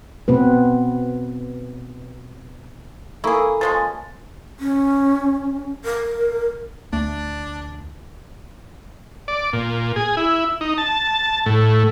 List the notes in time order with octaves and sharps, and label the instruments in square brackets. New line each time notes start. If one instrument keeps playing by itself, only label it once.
[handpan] B2 B3 C4 B4
[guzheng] A#3 [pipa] E4 G#4 [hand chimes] A4 A#5 [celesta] C#6
[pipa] F3 G#3 C#4 [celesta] A6
[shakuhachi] C#4
A#4
[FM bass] D2 [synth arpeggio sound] A3 [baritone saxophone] D4
[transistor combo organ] D5
A#2
G#4
E4
D#4
A5
A2